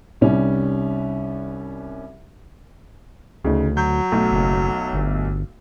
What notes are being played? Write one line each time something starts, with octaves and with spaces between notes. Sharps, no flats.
C2 G3 C#4 D#4
D2 C#3 D#4
F#3 G6
B1 A3
F#1
G1